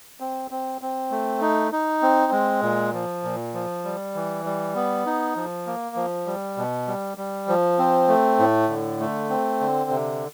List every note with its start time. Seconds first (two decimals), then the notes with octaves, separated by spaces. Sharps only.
0.20 C4
0.51 C4
0.82 C4
1.11 A3
1.41 D#4
1.72 D#4
2.02 C4
2.32 G#3
2.63 A#2
2.93 F3
3.24 A#2
3.54 F3
3.84 G3
4.15 E3
4.45 G3
4.75 B3
5.06 D#4
5.36 F3
5.67 A#3
5.96 F3
6.26 G3
6.57 B2
6.88 G3
7.18 G3
7.48 F3
7.79 C4
8.08 A3
8.39 A2
8.69 D3
9.00 A3
9.30 C4
9.61 D3
9.90 C3